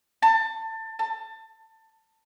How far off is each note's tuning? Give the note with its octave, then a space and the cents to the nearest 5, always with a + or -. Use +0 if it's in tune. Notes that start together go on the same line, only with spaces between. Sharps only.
A5 +25
A5 +20